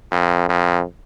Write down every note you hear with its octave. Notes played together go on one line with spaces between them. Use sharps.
F2
F2